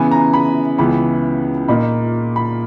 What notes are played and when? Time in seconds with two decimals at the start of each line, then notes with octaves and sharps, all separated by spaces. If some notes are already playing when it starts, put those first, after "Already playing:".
Already playing: C#3 E3 B3 G#5
0.11 A#5
0.33 B5
0.78 C#2 C#3 E3 B3 B5
1.68 A#2 A#3 D#4 B5
2.36 B5